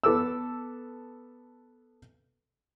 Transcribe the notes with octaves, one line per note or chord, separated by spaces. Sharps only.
B3 A4 D6 E6